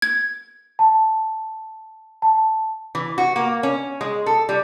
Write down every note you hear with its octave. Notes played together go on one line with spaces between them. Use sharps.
G#6
A5
A5
E3
F#4
A#3
C#4
G#3
A4
G3